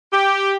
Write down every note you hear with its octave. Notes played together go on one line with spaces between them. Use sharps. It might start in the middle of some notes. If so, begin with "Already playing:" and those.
G4